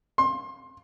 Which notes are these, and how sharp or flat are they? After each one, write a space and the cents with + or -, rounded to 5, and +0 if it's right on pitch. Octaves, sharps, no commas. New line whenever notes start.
C6 +25